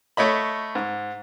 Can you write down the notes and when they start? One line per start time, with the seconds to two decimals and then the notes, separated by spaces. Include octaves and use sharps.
0.17 A3 C#5 D#5 B5
0.75 G#2